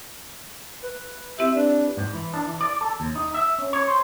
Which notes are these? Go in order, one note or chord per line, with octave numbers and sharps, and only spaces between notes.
B4
C4 E4 G4 E5
D4 B4
G#2
E3
D4
E3
D5
A4
D#2
D#4
E5
C#4
C#5
C5